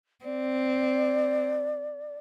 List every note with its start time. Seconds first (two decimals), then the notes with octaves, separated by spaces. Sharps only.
0.24 C4 D5